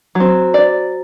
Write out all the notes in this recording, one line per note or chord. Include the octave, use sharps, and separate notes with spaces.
F#3 C4
D5